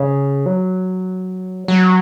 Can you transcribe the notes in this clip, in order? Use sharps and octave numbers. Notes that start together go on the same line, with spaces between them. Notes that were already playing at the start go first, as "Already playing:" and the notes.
Already playing: C#3
F#3
F#3